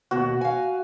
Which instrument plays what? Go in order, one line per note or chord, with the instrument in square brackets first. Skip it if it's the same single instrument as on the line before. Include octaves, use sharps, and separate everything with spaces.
[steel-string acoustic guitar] D#2 B2 [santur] F#4
[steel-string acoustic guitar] F5 G#5